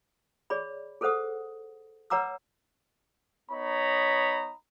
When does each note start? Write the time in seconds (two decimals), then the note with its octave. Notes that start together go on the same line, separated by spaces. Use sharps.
0.50 G#4 C#5 D5 B5
1.01 G#4 A4 B4 C5 F#5 D#6
2.10 B4 C#5 F#5 A#5 D6 E6
3.51 B3 D#4 C#5 A#5 B5